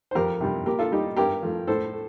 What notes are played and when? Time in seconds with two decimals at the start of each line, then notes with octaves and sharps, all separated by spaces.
0.11 C5
0.15 F2 G4 A#4
0.41 C3 G3
0.66 A#2 G4 A#4
0.79 F4 A4
0.92 G3 D#4 G4
1.17 G2 G4 A#4
1.43 F3 A3
1.67 A2 A4 C5
1.93 A3